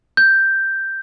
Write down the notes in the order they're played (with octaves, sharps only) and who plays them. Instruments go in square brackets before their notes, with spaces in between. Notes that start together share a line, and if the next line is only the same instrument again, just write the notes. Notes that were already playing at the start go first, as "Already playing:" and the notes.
[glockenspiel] G6